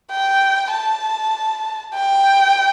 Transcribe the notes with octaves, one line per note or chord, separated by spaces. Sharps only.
G5
A5
G5